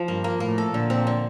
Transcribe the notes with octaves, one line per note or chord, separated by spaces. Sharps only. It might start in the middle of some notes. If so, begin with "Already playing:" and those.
Already playing: F3
G2 A#3
A#3
A2 A#3
A4
A#2 D3
C4
D3